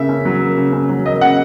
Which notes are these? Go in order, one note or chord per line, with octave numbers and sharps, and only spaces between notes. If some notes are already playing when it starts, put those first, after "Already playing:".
Already playing: C#3 A#3 E5
C#4
F#3
A#3
C#3
C#4
F#3
A#3 D#5
C#3 F#5